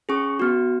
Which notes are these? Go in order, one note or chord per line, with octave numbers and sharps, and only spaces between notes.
C#4 G#4 C#6
B3 F#4